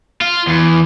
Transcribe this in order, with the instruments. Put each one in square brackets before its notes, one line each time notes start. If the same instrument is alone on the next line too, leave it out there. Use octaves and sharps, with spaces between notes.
[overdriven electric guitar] F4
E2